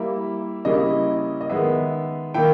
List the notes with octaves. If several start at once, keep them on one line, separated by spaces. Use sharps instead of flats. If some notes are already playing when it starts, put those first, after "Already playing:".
Already playing: G3 A#3 E4 E5
C#3 G3 A#3 C#4 E4 D#5
D#5
D#3 G#3 B3 E5
D#3 A#3 E4 G5